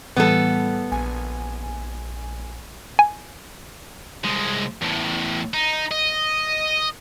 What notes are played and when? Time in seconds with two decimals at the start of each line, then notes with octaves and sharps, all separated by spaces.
0.16 A2 E3 G3 B3 A4
0.92 A#1 G#5
2.99 G#5
4.25 C2 G#3
4.82 E2 A2
5.54 D#4
5.91 D#5